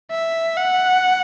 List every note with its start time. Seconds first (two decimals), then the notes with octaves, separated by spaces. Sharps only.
0.11 E5
0.57 F#5